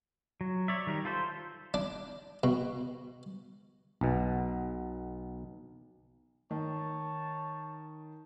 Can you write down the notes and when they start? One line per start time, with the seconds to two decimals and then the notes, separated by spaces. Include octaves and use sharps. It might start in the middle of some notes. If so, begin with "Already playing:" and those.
0.41 F#3
0.68 C#5 D5 E5
0.87 D#3 G3 A#4
1.05 F4 A4 C5 E5
1.74 D4
2.43 B2
4.01 B1 B2
6.51 D#3 C#5 A5